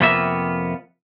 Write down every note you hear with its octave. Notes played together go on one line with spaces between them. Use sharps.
F2 C3 A#3 B3 F4 E5